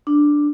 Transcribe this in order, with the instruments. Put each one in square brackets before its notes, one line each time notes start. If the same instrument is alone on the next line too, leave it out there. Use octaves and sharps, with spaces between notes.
[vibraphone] D4